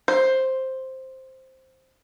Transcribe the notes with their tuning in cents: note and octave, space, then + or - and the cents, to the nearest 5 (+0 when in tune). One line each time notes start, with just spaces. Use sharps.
C5 +5